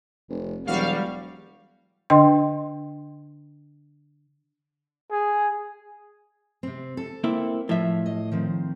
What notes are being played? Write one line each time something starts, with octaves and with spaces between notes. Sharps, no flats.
F1
E1 F#3 G3 F#4 F5
D3 D4 D#5 G5 C6
G#4
C3 C4
A4
A#3 C4 E4
A2 F3 E5
D#5
D#3 F3 C4